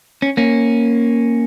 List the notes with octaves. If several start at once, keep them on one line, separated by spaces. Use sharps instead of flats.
C#4
A#3 C#4